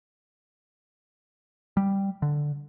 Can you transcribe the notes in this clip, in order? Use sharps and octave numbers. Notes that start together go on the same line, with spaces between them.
G3
D3